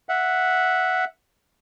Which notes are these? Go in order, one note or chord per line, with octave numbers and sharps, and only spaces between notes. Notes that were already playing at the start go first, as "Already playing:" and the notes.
E5 F#5